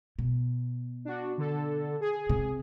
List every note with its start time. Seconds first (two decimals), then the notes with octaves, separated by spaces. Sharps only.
0.19 B2
1.05 D4 F#4
1.38 D3 A4
2.01 G#4
2.29 C3